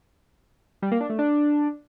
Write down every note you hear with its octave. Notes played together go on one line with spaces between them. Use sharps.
G3
A#3
D4
A3
D4